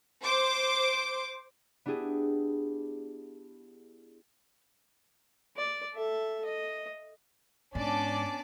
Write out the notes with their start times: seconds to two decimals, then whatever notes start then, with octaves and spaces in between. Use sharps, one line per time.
0.22 C5 D6
1.86 B3 D4 E4 G4 G#4
5.57 D5
5.93 A4 E5
6.45 D#5
7.75 G#2 B3 C#4 D4 D5 A5 D6